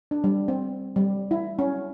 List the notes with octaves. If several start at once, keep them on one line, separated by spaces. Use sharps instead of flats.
D4
G3
C4
G3
E4
C#4